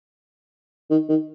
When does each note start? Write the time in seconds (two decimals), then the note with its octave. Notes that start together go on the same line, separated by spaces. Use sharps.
0.91 D#3
1.09 D#3